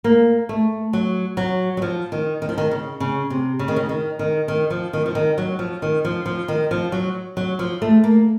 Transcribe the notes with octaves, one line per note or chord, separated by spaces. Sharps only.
A#3
A3
F#3
F#3
F#3
F3
D#3
D#3
F3
D#3
C#3
C#3
C3
C#3
D#3
C#3
D#3
D#3
D#3
F3
D#3
F3
D#3
F#3
F3
D#3
F3
F3
D#3
F3
F#3
F#3
F3
A3
A#3